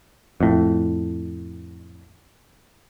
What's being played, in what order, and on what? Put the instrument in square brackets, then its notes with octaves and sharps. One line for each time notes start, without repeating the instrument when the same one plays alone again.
[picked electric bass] F2 A2